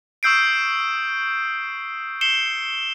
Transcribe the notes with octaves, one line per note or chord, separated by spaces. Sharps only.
C#6 D#6 E6 G6 C7 D7
C7 C#7 E7 G7